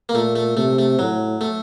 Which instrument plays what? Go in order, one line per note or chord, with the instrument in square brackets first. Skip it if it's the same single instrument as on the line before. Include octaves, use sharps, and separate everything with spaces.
[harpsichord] A#3
[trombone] A#2 [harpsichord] A3
[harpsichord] A3
[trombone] C3 [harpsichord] A3
[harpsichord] A3
[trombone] A2 [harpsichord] F#3
[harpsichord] A3